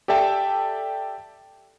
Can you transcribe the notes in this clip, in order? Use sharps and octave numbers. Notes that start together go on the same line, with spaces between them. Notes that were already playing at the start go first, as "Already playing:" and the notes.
G4 A4 D5 E5 G5 A5